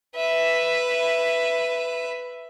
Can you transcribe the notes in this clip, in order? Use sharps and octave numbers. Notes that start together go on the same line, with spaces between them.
B4 E5